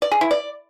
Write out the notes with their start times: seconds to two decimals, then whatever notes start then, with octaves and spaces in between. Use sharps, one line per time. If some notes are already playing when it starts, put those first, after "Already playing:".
0.02 D5
0.12 G#4
0.21 E4
0.31 D5